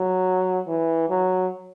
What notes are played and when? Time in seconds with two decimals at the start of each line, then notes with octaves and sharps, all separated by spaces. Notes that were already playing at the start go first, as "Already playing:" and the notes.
Already playing: F#3
0.68 E3
1.10 F#3